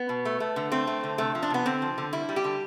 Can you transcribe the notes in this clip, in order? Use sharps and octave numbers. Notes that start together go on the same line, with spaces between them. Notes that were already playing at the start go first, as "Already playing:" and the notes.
Already playing: B3
B2
A3
A3
D3
A3 C4
A3
D3
C3 A3
F3
D4
C3 B3
D3 C4
F3
D3
G3 E4
G3
G4
D3